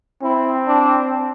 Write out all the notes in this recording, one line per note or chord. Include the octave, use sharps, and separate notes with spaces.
C4 E4
D4